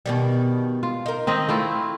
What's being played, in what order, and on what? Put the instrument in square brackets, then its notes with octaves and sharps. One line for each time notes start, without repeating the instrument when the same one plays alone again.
[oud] B2 D#3 G3
[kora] F4
[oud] D#4 A#4
[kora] D#3 C4 D#5
A3 E4 F4